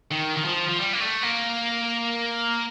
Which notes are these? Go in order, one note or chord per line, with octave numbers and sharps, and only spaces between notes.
D#3
D#3
F3
F3
G3
A#3
A3
A#3